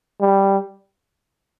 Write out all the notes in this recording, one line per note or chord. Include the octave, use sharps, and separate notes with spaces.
G3